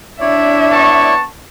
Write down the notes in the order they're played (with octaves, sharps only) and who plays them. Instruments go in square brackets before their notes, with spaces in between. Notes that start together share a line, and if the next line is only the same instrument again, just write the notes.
[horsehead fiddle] D4 E5 [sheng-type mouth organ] E4 C#5 D5
[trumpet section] B3 A5 C#6